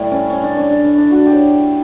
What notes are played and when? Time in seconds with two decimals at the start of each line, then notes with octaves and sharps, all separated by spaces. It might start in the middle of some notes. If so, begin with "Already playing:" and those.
Already playing: A2 G3 E4
0.11 C#4
0.30 C#4
0.43 D4
0.57 C#4
0.70 D4
0.84 D4
0.98 D4
1.11 F#4
1.26 G4
1.33 C#5